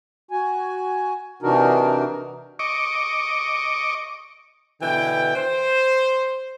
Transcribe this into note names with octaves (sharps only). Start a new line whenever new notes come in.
F#4 G#5
C3 E3 D4 D#4 F#4 A#4
D#5 C#6 D6
B2 D3 E3 G5
C5